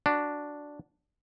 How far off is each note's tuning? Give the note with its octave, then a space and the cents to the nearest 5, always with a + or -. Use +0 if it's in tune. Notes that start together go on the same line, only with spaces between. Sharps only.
D4 +0 F#4 +0